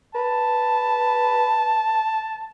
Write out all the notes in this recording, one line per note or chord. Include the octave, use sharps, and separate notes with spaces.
B4 A5